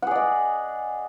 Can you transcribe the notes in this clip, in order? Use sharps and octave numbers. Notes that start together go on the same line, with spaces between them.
G#4 D5 D#5 F#5